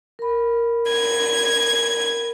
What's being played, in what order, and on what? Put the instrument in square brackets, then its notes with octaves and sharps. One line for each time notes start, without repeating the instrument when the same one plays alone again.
[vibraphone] A#4 B5
[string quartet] G#6